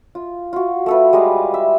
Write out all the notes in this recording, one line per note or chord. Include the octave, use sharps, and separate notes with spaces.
F4
F4 F#4
A3 A4 B4
G3 G#3 D#5 F5
E5